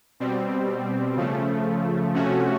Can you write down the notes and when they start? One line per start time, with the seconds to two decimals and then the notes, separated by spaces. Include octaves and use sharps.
0.20 B2 G3 C4
1.16 C#3 F3 A3
2.14 C3 F3 A3 C#4 F#4